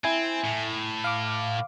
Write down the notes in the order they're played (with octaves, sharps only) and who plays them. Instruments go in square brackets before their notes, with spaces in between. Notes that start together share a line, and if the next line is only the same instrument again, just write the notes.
[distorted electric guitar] C4 [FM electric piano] E4 G#5
[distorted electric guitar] A2
[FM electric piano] F5 D6